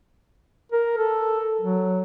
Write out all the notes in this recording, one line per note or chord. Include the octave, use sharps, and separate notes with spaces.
A#4
A4
F#3